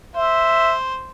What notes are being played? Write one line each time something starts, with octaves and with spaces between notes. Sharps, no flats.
C5 E5